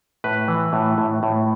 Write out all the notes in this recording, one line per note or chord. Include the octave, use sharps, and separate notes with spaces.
A2 B4
E3
A2
A2
A2